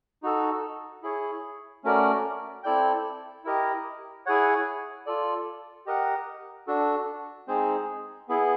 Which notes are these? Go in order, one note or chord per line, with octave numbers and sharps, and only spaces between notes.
D#4 F#4 A4
E4 G#4 C#5
A3 C#4 F#4 A#4 D5
C4 E4 A4 D5 G5
E4 G4 A#4 D#5
E4 G#4 C#5 F#5
F4 A4 D5
G4 A#4 D#5 F#5
D4 F#4 A4
G#3 C4 D#4 G#4 C5
B3 E4 G#4